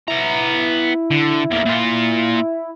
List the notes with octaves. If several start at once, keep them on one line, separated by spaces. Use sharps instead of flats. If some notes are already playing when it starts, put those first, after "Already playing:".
B3 E4 A#5
D3
E2 A#3
A#2 F4